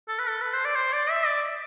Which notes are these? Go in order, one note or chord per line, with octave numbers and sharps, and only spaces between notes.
A4
B4
A4
B4
C5
D5
C5
D5
E5
D5